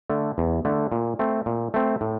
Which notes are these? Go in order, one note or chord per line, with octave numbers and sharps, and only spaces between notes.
D3 A3
E2
D3 A3
A#2
A3 C4
A#2
A3 C4
A2